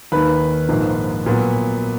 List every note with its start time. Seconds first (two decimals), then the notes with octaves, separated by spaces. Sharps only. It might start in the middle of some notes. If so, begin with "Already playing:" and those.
0.12 D#2 D#3 A#3 B4 B5
0.69 A#1 G#2 F3 A#3
1.26 A#2 F#3 B3